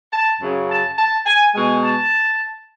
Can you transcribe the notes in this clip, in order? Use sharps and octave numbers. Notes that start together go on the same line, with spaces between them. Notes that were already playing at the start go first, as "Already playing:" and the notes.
A5
F#2 C#3 F#3
A5
A5
G#5
B2 G#3 G#5
A5